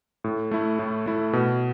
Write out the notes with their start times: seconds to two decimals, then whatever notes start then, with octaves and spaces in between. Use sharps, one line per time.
0.24 A2
0.51 A3 E4
0.79 A2
1.06 A3 E4
1.33 B2